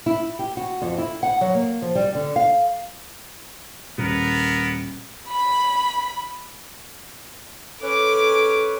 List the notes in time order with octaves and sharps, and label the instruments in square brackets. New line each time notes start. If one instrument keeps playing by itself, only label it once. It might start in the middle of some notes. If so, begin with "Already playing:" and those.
[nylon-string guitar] E4
G4
F#4
F2
E4
F#5
F#3
A#3
F3
G3
D3
F5
[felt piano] D#1 [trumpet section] B3 A#4
[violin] B5
[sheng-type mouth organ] C#4 B4 C#5 [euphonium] A4 [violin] D6